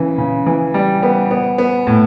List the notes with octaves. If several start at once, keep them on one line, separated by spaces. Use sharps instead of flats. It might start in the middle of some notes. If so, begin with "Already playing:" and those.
Already playing: C#3 E3
C#3
E3
G3
B3
B3
B3
A2